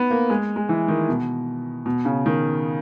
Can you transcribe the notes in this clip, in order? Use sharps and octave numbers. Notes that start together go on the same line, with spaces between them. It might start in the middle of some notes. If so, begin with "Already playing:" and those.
Already playing: B3 D#4
A#3
G#3
G#3
E3
D#3
B2
B2
C#3
D#3